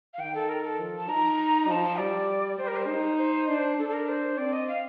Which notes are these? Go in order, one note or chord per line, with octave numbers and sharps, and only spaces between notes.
F5
D#3 G5
A4
A#4
A4
F3
A5
D#4 A#5
F3 A5
A5
G3 D5
G3 C5
A#4
C5
D#4
C5
D4
D4 A4
A4
A#4
C5
C4 D5
D#5
F5